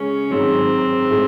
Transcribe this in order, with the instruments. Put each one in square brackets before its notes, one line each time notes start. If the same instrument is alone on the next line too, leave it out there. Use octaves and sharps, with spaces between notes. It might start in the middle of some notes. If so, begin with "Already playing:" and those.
Already playing: [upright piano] C#3 G#3 [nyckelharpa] C#4
[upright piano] G#2 D#3 F#3 [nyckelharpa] C4
[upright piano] A2 G#3